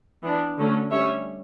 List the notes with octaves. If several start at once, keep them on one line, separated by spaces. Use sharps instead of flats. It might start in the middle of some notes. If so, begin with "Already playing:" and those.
E3 B3 D4
D3 F#3 A3 C#4
G3 C#4 C#5 E5